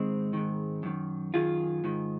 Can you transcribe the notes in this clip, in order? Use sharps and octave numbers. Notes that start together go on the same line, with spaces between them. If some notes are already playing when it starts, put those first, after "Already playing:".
Already playing: G#2 D#3 G#3 C4
G#2 D#3
F#2 D#3
F#2 D#3 F4 G#4
G#2 D#3